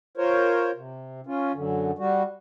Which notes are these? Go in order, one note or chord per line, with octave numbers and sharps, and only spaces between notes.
F4 A#4 C5 C#5
C3
C#4 F4
F#2 D3
G3 F#4